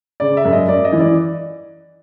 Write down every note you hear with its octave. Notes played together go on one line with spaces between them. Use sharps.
C#3 D5
E5
F#2
D#5
F#2 D5
D#5
E3
D5